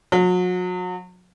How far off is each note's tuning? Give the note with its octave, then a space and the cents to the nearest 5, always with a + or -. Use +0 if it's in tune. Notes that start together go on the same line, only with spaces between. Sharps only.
F#3 -35